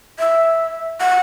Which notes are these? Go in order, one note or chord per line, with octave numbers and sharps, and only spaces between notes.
E5
F#5